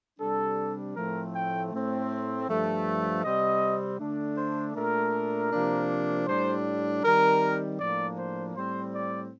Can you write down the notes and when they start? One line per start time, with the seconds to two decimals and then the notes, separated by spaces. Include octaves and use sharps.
0.19 C3 G3 D4 A4
0.96 A2 F3 A3 C4 A#4
1.34 G5
1.72 A2 A3 C4
2.48 G2 F3 A3
3.23 C3 G3 C4 D#5
3.99 D3 A3 D4
4.37 C5
4.75 A#2 A3 D4 A#4
5.52 C3 F3 A#3 D4
6.27 A2 G3 D4 C5
7.03 D#3 G3 C4 A#4
7.79 A2 F3 A#3 D4 D5
8.17 C5
8.55 A2 G3 C4 C5
8.93 D5